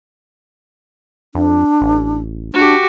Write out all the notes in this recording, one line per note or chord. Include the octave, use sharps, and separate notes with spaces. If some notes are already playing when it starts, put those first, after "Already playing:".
F2 D4
A1
D4 F#4 G4